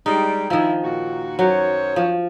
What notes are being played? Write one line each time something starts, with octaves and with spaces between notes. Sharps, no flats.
G3 G#3 D#4
D#3 F3 E4
A#2 F#4
F#2 F#3 C5 C#5
F3